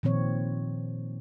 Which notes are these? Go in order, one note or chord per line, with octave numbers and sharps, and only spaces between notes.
A#2 D#3 F3 C4 C#5